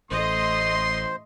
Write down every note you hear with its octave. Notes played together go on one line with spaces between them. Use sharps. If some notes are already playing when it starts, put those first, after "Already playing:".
A1 A3 C5 D#5 C6